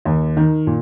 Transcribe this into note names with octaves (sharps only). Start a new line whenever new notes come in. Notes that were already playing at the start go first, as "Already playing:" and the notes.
D#2
D#3
A#2